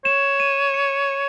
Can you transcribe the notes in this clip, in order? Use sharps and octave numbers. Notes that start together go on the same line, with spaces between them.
C#5 E7
D#7
C#7